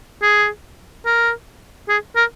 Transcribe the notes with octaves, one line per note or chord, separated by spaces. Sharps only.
G#4
A#4
G#4
A#4